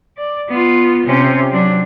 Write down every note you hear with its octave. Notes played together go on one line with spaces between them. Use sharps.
D5
B3 F4
C3 C#4
F#3 D4